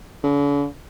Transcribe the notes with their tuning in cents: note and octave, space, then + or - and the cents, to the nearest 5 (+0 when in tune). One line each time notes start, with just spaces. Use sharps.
D3 -45